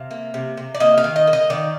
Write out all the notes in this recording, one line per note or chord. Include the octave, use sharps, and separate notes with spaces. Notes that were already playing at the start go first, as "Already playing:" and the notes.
Already playing: C3 F5
A#3
C3
C3
D5
A#3 D#5
F5
D#3
D#5
A#3
D#5
D#3 D5